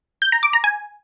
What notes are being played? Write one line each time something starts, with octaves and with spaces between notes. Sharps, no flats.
G6
A#5
D6
A#5
G#5